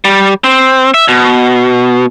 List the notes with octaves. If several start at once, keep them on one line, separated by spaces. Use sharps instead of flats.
G3
C4
E5
B2